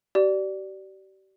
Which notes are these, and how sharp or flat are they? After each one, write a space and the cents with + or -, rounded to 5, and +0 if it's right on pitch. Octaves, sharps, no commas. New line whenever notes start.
G4 -40 D5 +0